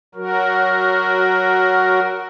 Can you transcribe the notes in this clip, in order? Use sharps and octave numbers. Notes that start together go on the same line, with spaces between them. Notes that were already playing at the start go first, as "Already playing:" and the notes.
F#3 F#4 A#4